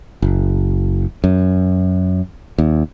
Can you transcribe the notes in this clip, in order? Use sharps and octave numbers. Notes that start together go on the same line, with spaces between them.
F#1
F#2
D#2